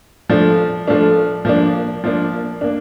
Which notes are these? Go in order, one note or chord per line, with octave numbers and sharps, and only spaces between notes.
F3 A3 D4
F3 A3 D4
F3 A#3 D4
F3 A#3 D4
A#3 D4